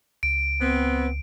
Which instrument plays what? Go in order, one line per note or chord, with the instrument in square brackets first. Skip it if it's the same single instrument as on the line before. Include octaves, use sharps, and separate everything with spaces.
[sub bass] C#2 [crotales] D7
[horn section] B3 C4